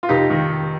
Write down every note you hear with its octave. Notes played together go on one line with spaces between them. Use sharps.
F4
F1 D#4 G4
D#3